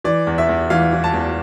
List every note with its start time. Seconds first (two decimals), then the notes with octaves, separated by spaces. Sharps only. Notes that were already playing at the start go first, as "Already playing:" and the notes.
0.04 E3 D5
0.27 E2
0.38 E5
0.49 E2
0.70 E3 F5
0.93 E3
1.04 A5
1.13 E2